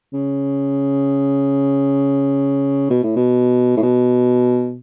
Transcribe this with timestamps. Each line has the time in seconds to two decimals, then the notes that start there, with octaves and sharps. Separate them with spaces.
0.13 C#3
2.90 B2
3.03 A2
3.16 B2
3.77 A2
3.83 B2